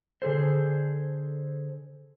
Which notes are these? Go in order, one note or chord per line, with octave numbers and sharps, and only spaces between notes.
D3 G#4 A4 C5